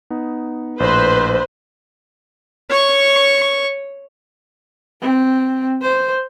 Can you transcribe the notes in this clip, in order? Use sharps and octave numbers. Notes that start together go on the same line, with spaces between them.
B3 D#4
A#1 A2 B4 C5
C#5 C#6
C4
C5